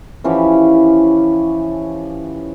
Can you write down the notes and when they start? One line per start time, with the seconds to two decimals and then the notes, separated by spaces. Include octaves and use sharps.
0.24 E3 F3 C#4 G4